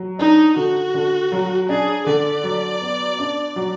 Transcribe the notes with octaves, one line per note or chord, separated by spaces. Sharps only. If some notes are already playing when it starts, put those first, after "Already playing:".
Already playing: F#3
D4 D#4
D3 F#4
D3
F#3
D4 G#4
D3 D5
F#3
B3
D4
F#3